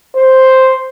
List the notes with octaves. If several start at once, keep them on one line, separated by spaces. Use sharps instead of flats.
C5